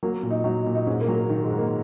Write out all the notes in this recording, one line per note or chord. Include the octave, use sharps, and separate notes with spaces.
F#3 A#3
A#2
D#4
F#3 D#4
A#2
D#4
G#2 C#4
A#3
F#3
A#3
D#3
G#3
G#2
A#3